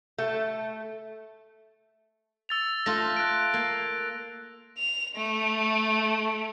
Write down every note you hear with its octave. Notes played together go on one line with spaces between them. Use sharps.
A3
E6 A6 F7
A3 F4 A#6
F#6 D7
A#3
F7
A3